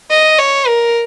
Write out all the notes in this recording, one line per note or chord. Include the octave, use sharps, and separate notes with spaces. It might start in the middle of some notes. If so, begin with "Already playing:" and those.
D#5
C#5
A#4